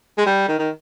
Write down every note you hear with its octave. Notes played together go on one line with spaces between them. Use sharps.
G#3
G3
D#3
D#3